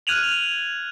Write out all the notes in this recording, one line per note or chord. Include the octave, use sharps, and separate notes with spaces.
F6 F#6 G#6 D#7 F7 F#7